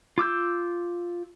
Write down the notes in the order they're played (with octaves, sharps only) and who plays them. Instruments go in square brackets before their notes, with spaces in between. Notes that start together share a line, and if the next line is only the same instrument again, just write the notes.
[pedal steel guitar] F4 D6 E6 G6